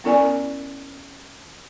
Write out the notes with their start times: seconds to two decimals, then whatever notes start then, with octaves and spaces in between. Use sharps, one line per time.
0.04 B3 C#4 E4 A#4 D5 G#5